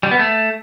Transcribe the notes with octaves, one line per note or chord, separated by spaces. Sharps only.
G3
B3
A3